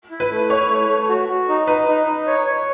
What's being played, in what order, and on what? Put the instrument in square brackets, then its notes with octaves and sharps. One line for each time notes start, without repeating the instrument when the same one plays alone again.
[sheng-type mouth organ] E4
[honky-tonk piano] B4
[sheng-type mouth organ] A3
[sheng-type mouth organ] E4 [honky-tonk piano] C#5
[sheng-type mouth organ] A3
A3
F#4
F#4
D#4
[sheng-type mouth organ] D#4 [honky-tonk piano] B4
[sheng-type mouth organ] D#4
D#4
C#5
C#5